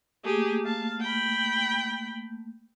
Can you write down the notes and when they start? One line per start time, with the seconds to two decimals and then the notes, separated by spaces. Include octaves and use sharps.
0.25 A3 A#3 G4 G#4
0.64 F5 A5
1.01 G5 B5